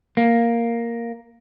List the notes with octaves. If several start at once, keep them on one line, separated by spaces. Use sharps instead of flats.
A#3